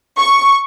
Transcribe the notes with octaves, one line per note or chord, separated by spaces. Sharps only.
C#6